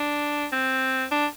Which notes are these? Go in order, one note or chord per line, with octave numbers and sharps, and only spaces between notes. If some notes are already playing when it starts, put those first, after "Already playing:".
Already playing: D4
C4
D4